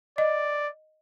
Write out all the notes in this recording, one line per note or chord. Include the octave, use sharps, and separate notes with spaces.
D5 D#5